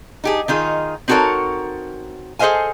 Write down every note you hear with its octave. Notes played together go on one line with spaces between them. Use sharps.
D#4 G4 G#4
D#3 D#4 F4 G#4
C4 D#4 F#4 A4 A#4 C#5
G#4 A4 C5 D#5 F5 G#5